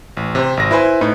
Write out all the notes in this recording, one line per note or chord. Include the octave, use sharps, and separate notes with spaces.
A1
C3 C5
G#1 A#6
E4 B4 C5 G#5
A2 D#4 B4